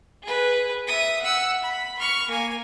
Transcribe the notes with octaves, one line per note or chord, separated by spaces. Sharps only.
G#4 B4
E5 D#6
F#5 E6
B5
C#6 F6
A#3 G#5